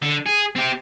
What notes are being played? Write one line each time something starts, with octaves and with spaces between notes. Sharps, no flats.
D3
G#4
C4 G4